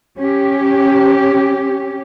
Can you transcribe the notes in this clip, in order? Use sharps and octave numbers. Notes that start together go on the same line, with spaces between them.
C#4 G4